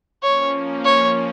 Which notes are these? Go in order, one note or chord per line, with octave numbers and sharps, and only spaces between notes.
F3 A#3 C#4 C#5
C#5